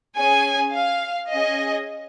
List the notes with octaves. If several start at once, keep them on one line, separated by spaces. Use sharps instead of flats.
C#4 G#4 G#5
F5
C#4 G#4 D#5